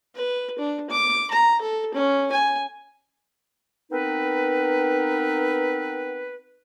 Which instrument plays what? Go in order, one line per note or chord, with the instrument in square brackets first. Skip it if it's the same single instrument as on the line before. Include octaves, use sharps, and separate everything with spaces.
[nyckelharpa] B4
D4
D6
A#5
A4
C#4
G#5
[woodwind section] B3 C4 D#4 A#4 B4